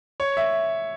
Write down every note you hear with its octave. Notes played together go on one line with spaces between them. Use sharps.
C#5
E5